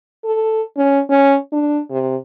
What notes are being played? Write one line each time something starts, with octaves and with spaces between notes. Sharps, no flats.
A4
C#4
C#4
D4
C3